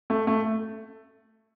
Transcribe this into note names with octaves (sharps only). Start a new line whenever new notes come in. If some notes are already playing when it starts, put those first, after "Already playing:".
A3
A3